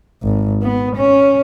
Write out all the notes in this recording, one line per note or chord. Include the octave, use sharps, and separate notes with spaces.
G#1
B3
C#4